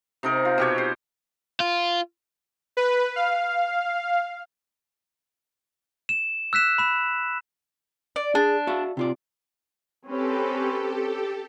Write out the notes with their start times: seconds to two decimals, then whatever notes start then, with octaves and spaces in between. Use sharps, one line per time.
0.23 C3 D#4 A#4
0.45 F4
0.58 B2 G4 C#5
0.78 C5
1.60 F4
2.77 B4
3.16 F5
6.09 E7
6.53 E6 F#6 B6 E7
6.78 B5 E7
8.16 D5
8.35 D4 G#4
8.67 F#4 E5 F5
8.97 C3 F4 D5
10.07 C4 C#4 G4 A4 B4